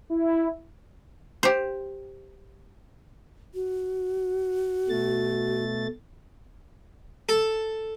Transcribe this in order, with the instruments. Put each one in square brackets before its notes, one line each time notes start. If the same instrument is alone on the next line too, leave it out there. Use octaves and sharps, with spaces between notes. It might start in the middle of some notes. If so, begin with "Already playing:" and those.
[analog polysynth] E4
[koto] G4 C5
[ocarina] F#4
[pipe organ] B2 A3 A6
[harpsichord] A4